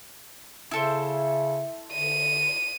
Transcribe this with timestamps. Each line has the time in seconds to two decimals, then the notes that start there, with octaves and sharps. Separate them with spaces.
0.71 C#3 E4 A4 C5
1.93 D3 D#7